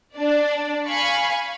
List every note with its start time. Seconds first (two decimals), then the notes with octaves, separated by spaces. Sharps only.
0.15 D4 D5
0.88 F5 G#5 B5 C#6